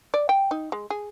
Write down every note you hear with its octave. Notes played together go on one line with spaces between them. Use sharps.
D5
G5
D#4
G#3
G#4